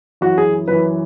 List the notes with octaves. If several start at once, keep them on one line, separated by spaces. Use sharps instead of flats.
F#2 E3 F#4
G#4
F#2 E3 B4